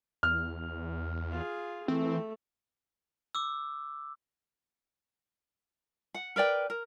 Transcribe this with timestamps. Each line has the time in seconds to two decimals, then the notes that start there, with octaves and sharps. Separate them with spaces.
0.23 E2 F6
1.31 F4 G#4
1.88 E3 A3 C4
3.35 D6 E6
6.14 F#5
6.36 A#4 B4 D5 G5
6.70 A#4